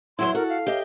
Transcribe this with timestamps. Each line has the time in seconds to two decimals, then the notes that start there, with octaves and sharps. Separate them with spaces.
0.19 E2 F#3 E4 C6
0.35 F#4 A4 A#4
0.49 F5
0.67 G4 D#5 E5